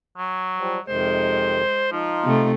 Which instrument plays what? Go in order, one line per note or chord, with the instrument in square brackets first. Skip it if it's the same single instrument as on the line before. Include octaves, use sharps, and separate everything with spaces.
[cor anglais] F#3 [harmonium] G#5
[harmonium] F3 G3
[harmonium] F2 C3 D#3 [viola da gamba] G#3 [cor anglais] C5
[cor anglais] F3 [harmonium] D#4 F4
[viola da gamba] C3 A3